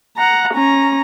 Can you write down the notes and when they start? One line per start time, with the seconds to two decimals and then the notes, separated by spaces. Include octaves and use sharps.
0.17 F#5 A#5
0.55 C#4 A#5